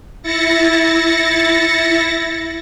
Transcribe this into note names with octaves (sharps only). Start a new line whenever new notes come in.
E4 A6 A#6 C#7